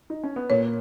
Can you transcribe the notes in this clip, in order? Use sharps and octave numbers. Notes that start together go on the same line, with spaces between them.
D#4
C#4
B3
A#2 A#3 C#5